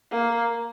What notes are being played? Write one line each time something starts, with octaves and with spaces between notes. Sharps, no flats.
A#3